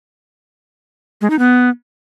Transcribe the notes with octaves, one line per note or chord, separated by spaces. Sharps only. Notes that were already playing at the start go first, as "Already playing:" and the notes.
G#3
D#4
B3